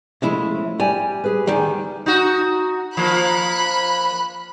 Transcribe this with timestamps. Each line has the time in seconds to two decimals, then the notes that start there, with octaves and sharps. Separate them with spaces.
0.22 C#3 F3 G#3 A3 E4
0.80 G3 G#5
1.24 G4 G#4 B4
1.47 D2 D#3 G3 G#5
2.06 D#4 F#4
2.97 F3 A#3 B5 F#6